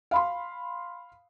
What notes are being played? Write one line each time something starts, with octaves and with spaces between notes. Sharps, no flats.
F5 B5 C6